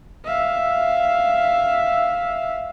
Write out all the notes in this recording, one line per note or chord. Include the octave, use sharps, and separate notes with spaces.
E5 F5